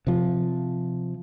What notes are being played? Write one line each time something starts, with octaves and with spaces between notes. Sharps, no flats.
C3 F3